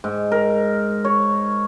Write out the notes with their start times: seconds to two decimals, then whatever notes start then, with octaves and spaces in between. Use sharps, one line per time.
0.04 G#2
0.32 A#4
1.05 C#5